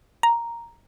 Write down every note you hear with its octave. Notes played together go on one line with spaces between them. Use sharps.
A#5